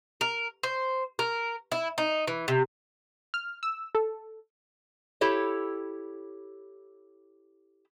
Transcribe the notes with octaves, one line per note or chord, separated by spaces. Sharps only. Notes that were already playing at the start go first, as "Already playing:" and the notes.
A#4
C5
A#4
E4
D#4
E3
C3
F6
E6
A4
E4 G4 A4 C#5